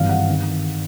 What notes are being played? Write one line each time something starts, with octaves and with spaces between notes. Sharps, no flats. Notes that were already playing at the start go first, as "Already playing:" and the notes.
Already playing: G#1 G2 E3 F5
F#5
D#3